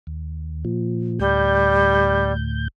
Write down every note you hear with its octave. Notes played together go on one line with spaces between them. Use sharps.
D#2
A#2 F3
D2 A2 G3 G6